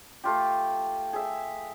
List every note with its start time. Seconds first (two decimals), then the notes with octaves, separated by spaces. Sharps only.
0.24 A3 F4 G4
1.13 G#4 E5